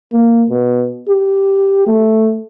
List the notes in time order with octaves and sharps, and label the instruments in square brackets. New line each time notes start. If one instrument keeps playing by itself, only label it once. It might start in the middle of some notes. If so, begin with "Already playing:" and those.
[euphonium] A#3
B2
G4
A3